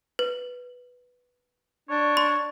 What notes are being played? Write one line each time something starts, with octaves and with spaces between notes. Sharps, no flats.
B4
D4 C#5
C6